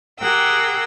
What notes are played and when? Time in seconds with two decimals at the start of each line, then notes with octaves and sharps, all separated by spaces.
0.19 G4 G#4 A#4 F#5 G5 E6